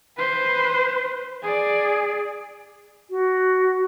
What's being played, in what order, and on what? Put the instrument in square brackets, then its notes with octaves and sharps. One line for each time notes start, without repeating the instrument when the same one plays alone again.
[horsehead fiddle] B4 C5
G#4 D5
[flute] F#4